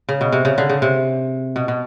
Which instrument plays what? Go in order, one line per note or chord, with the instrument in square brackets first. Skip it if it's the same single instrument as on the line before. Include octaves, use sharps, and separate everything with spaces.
[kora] C#3
B2
C3
C#3
D3
C#3
C3
B2
B2